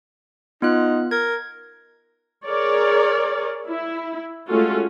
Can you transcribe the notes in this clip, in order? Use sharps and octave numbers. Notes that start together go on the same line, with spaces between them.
B3 D#4 F4 F#6
A#4 G#6
G#4 A#4 C#5 D5
E4
G#3 A3 C#4 F4 F#4 A4